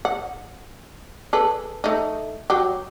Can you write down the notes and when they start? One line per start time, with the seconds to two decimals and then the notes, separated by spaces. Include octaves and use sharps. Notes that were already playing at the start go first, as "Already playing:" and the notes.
0.05 F#5
1.33 G#4 A4 B4
1.84 A3 D#4
2.50 F#3 G4